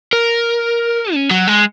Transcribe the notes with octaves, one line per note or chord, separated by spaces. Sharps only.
A#4
C#4
F#3
G#3